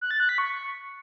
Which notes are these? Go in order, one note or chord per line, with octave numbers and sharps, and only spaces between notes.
F#6
A6
F#6
B6
C#6